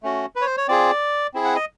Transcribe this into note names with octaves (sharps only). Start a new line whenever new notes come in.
A3 C#4 F#4
B4
C#5
C5
C#5
C4 F4 G#4 D5
C4 E4 G#4
F#5
D#5